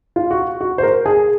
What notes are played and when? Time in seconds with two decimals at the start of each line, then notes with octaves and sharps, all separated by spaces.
0.16 F4
0.31 F#4
0.61 F#4
0.78 C5
0.83 A#4
1.06 G#4